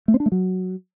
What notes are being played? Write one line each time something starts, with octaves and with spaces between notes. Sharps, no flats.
A3
C4
D4
A3
F#3